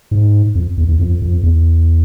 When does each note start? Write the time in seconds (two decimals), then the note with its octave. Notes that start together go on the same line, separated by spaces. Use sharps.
0.11 G#2
0.55 F2
0.77 E2
0.88 E2
0.99 F2
1.22 F2
1.43 E2